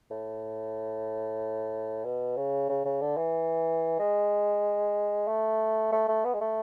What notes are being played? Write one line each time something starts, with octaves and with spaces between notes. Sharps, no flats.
A2
B2
C#3
C#3
C#3
D3
E3
G#3
A3
A3
A3
B3
G#3
A3